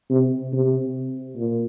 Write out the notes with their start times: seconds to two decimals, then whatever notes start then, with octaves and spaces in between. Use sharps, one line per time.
0.11 C3
0.53 C3
1.36 A#2